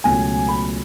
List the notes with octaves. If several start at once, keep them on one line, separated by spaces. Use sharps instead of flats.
C#2 B2 F#3 A3 G#5
B5